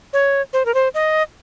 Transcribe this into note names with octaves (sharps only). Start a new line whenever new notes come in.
C#5
C5
A#4
C5
D#5